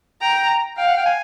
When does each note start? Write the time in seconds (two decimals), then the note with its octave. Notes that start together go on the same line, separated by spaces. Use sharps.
0.21 G5 A#5
0.77 F5 G5
0.87 F#5
0.97 G5
1.06 G#5